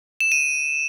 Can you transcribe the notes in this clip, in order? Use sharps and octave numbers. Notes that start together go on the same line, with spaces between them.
E7
D#7